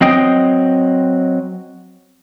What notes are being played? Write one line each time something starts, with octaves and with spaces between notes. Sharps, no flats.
F#3 C4 D#5 G5 D#6